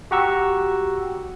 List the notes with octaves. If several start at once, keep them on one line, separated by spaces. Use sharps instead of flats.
F#4 G4 F#5 A#5 C#6 E6